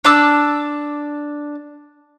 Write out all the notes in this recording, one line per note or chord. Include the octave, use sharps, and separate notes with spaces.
D4 A5 D6 E6